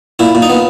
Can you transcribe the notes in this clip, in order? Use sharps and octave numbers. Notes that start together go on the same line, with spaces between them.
A#2 E4
A#2
D#4
B3